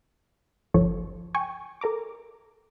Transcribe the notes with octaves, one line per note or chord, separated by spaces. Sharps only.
G1 C#2 F3 A4 C#5
G5 G#5 C#6
A4 A#4 A#5 D6